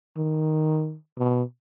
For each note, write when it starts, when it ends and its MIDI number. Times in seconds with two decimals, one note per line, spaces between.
0.17 0.96 51
1.18 1.43 47